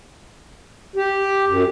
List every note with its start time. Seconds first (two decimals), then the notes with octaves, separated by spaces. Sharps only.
0.96 G4
1.47 F#2